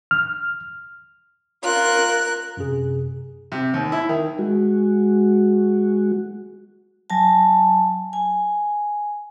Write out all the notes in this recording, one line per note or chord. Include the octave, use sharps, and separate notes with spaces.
F6
F4 A#4 F#6
F#2 C3 G#4
C3
D#2
E4
D#3
G#3 F#4
F#3 G#5 A5
G#5